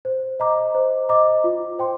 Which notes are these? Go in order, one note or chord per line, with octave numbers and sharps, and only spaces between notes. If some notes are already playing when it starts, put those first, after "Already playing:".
C5
D#5 A#5 D6
C5
D#5 A#5 D6
F4
C5 G5 C6